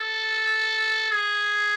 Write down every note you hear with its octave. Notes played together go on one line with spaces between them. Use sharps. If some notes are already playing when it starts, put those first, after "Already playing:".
Already playing: A4
G#4